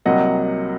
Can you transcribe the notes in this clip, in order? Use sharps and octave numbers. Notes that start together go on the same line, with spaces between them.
C2 C3 F#3 A#3 D#5 F#5